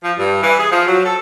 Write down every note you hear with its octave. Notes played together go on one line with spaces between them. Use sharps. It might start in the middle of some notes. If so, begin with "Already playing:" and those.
F3
G2
E3
G#4
F3
F#3
A4